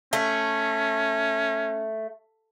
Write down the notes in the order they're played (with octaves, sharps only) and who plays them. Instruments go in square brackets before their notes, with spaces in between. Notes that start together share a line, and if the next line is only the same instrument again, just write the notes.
[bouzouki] A3 [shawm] C#4